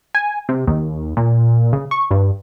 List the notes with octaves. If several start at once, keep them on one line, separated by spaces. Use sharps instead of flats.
G#5
C3
D#2
A#2
C#3
C#6
G2